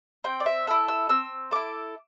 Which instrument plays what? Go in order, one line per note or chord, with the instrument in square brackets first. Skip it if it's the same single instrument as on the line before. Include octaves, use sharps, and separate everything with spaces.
[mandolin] C4 G5
D5
E5
E4 A4 E6
E6
C4 E6
E4 A4 D6